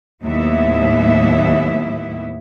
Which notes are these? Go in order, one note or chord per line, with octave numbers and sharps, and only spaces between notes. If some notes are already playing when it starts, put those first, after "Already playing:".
D#2 A2 F#3 B3 E4 E5